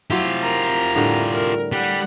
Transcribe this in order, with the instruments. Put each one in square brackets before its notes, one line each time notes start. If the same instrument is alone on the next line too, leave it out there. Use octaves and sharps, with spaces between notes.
[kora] F#3 C4 E4 [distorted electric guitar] F4 G4
[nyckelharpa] A#4 A#5
[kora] A2 D3 G3
[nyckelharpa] A#4
[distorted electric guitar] G3 [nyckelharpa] F#5